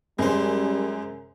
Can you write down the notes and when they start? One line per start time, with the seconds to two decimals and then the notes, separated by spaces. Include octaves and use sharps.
0.19 F#2 G3 G#3 C5